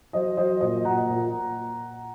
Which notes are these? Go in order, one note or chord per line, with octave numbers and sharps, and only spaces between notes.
F#3 C5 D#5
F#3 C5 D#5
A#2 C5 D#5
A#2 F#5 A#5
A#2